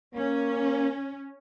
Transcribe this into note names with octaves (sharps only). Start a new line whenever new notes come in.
A#3 C#4